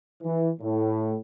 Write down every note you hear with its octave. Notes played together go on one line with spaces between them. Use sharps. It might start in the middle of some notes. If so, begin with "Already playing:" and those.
E3
A2